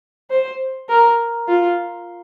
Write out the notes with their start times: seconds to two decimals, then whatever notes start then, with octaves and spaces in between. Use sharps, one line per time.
0.30 C5
0.89 A#4
1.48 F4